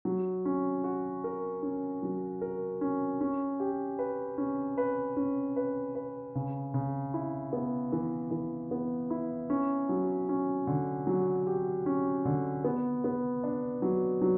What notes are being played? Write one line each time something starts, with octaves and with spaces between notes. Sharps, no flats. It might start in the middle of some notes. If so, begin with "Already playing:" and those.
F#3
C#4
F#4
A#4
C#4
F#3
A#4
C#4
C#4
G4
B4
C#4
B4
C#4
B4
B4
C#3
C#3
E4
B3
E3
E3
B3
E4
C#4
F#3
C#4
D3
F#3
G4
C#4
D3
B3
B3
D4
F#3
F#3